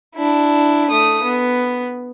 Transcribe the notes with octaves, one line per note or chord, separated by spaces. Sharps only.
D4 E4
A3 D#6
B3